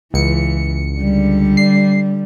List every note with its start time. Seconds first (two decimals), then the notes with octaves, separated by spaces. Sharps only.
0.14 C#2 E3 C#7
0.98 D3 G3
1.57 C7